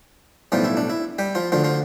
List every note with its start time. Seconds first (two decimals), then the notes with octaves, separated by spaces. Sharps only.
0.52 B1 A2 F3 G3 F4
0.64 E4
0.77 D4
0.90 E4
1.18 G3 G4
1.35 F3 F4
1.52 D2 D3 F3 F4
1.64 F3 F4